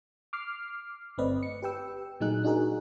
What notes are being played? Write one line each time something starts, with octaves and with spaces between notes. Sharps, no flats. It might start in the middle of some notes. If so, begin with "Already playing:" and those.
D6 F6 C7
G1 A3 C4 B4 D5 D#5
C#7
G4 B4 G5 E6
A#2 F#3 A3 D#4 G#4 F#6
D4 D#4 F#4 G#4 A#4